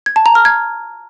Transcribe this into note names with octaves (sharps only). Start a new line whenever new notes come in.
G#6
A5
A#5
F6
G#6